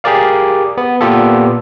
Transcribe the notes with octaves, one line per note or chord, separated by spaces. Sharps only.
G4 G#4 A#4 D5 F5
B3
A#2 B3 F4 G4 A4